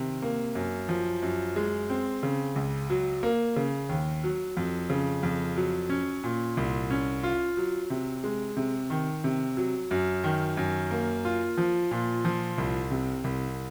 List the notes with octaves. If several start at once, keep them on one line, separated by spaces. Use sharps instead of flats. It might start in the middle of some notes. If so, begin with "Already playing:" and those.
Already playing: C3 D#3
A#3
F#2
F3
F#2
G#3
C4
C#3
C#2
F#3
A#3
C#3
D#2
F#3
F2
C#3
F2
F#3
C#4
A#2
C2
C#4
F4
F#3
C3
G#3
C3
D#3
C3
F#3
F#2
D#3
F#2
A#3
F4
F3
A#2
F3
C2
C3
C2